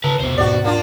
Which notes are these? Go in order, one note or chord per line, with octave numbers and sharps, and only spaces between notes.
C#3 B4 A5 A#5
E1 C2 B2 B3 C5
D#2 G#2 F#4 D5
A#3 D4 F4